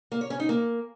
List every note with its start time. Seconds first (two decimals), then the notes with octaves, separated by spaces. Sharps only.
0.12 A#3
0.21 C#5
0.30 C#4
0.40 D#4
0.49 A#3